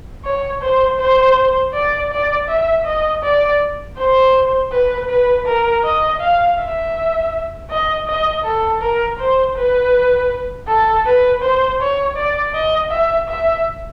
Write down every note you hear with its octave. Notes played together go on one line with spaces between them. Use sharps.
C#5
C5
C5
D5
D5
E5
D#5
D5
C5
B4
B4
A#4
D#5
F5
E5
D#5
D#5
A4
A#4
C5
B4
A4
B4
C5
C#5
D5
D#5
E5
E5